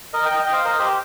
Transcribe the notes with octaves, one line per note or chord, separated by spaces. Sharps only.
A#4 D#5
D#5 G5
D#5 G5
C5 F5
A#4 D#5
G4 C5